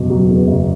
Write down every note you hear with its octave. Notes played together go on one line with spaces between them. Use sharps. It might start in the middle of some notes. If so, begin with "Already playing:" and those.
Already playing: F#1 E2 B2
F#3
E2
F#1